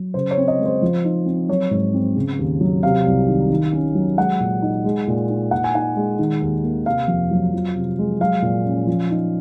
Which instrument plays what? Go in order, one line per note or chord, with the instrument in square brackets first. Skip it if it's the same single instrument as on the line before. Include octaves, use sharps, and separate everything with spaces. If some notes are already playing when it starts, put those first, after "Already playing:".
Already playing: [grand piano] F#3
C#3 C5
C#5
C4
D#5
G#3
C5
F3
D#4
C4
F#3 C#5
G#2
C4
C#3
D#2
F#3
C3 F5
C2
D#3
D#3
C#4
F#3
G#3 F#5
A#2
D#4
G#3
A#2
D#4
A#2 F#5
G#5
D#4 F#5
G#3
D#3
D#2
A#3
C3 F5
F2
F#3
F3
C3
G#3
F#3 F5
A#2
C#4
F3
D#4